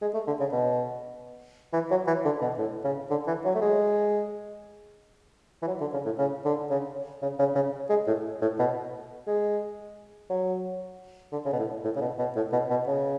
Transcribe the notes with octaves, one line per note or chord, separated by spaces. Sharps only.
G#3
A3
D3
C#3
B2
E3
F#3
E3
D3
B2
A2
C#3
D3
E3
F#3
A3
G#3
E3
F#3
D3
C#3
A2
C#3
D3
C#3
C#3
C#3
C#3
G#3
A2
A2
B2
G#3
F#3
D3
C#3
B2
A2
A2
C#3
B2
B2
A2
B2
B2
C#3